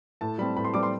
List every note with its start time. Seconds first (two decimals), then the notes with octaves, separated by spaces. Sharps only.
0.21 A2 A5
0.38 G3 C4 B5
0.56 A2 B5
0.64 C6
0.74 G3 C4 D6
0.83 C6